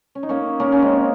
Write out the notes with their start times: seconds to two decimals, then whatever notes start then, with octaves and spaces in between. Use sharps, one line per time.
0.15 C#4
0.23 D#4
0.29 A#3 C#4
0.60 A#3 C#4
0.72 C#4
0.82 G#3 C4